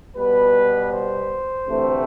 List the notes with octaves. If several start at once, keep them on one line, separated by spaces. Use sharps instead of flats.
B2 G3 B3 B4
C5
D2 C3 E3 A3 C4